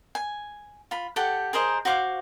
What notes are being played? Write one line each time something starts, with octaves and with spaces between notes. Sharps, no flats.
G#5
F4 B5
G4 A4 F#5 G5
G#4 A#4 C5 D#5
F#4 C5 F5 D6